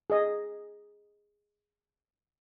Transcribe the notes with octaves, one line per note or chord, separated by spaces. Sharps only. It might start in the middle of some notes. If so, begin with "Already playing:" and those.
G#4 D#5